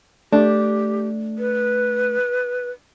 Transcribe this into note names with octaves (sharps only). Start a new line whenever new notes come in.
A3 D4 G4
B4